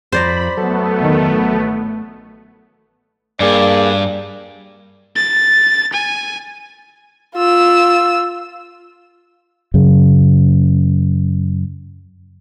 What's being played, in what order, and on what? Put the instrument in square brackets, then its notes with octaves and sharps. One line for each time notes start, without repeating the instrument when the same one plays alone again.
[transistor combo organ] F2 [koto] C5 D5 A#5 [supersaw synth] B5
[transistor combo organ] F#3 A4 [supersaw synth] A3 B3
[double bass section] E2 D#3
A1
[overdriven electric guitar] G2 [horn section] A#3 G#4 D5
[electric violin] A6
G#5
[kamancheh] F4 E6
[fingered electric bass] F#2 C#3